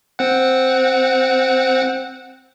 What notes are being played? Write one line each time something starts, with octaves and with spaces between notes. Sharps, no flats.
C4 F#5